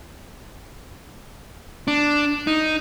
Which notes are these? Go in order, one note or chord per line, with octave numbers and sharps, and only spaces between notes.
D4
D#4